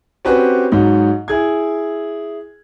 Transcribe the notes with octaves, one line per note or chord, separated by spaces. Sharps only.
C4 C#4 F#4 G4 B4
G#2 F#3 D#4
E4 G#4 G#6